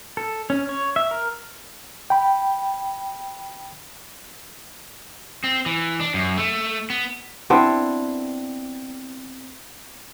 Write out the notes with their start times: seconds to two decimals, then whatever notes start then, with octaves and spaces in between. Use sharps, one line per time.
0.17 A4
0.50 C#4
0.69 C#5
0.96 E5
1.11 A#4
2.10 G5 B5
5.44 C4
5.66 E3
6.00 D4
6.14 F#2
6.37 A3
6.90 B3
7.50 B3 C4 D4 E4